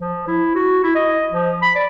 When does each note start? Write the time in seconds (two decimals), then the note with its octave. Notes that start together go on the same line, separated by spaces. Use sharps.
0.01 F3
0.28 E4
0.55 F#4
0.84 E4
0.96 D#5
1.32 F3
1.62 B5
1.76 D5